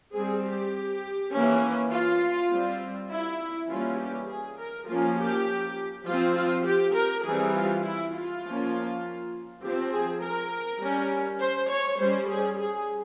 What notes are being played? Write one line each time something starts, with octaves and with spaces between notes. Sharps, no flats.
G3 C4 G#4
G4
E3 A#3 C#4
F4
G3 C4
E4
E3 G3 A#3 C#4 F4
G4
G#4
A#4
F3 A#3 C#4 F4
G4
F3 C4 F4
F4
G4
A#4
E3 G3 C4 G#4
F4
E4
F4
F3 A#3 C#4
F3 C4 G4
G#4
A#4
G3 C#4
C5
C#5
G3 C#4 C5
G#4
G#4